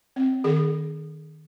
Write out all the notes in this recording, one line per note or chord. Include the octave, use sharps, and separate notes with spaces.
C4
D#3 G#4